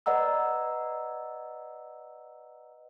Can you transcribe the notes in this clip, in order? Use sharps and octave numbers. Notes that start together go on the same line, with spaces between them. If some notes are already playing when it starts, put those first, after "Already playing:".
B4 D5 D#5 F#5 A#5 E6